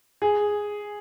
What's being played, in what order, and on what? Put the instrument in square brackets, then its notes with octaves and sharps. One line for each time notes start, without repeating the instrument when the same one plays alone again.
[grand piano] G#4